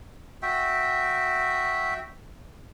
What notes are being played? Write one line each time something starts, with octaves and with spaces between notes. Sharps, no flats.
F#4 E5 G5